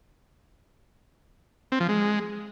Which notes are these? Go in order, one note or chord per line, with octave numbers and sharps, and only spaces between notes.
C4
F3
G#3